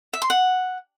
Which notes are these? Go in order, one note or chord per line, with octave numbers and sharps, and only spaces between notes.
E5
C6
F#5